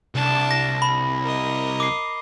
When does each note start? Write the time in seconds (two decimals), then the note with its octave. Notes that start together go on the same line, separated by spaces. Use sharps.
0.15 C2 D4 A5
0.51 A#6
0.82 B5
1.22 A#4 D#5
1.80 D6 C7